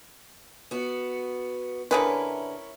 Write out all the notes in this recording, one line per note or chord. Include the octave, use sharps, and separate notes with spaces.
B3 F#4
D3 C#4 E4 G#4 A#4 B4